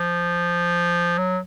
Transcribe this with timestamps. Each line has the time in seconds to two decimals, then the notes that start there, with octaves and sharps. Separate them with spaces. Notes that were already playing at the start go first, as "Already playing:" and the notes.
Already playing: F3
1.18 F#3